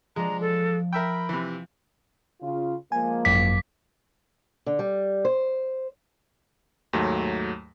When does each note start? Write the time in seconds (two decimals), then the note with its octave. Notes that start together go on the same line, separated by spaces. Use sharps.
0.16 F3 G#3 D4 A#5
0.41 A4
0.93 A#4 E5 G5 B5
1.29 C3 E3
2.42 C#3 F4
2.92 F3 G#3 A#3 G#5
3.25 G#1 F#2 D6 B6
4.66 D3
4.79 G3
5.25 C5
6.93 D#2 G#2 F#3 A3